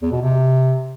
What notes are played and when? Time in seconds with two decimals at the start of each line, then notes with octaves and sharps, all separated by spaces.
0.02 E2
0.12 B2
0.21 C3